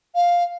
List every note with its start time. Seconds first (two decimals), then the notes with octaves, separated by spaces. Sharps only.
0.15 F5